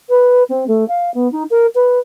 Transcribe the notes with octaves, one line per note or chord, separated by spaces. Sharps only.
B4
C4
A3
F5
B3
D#4
A#4
B4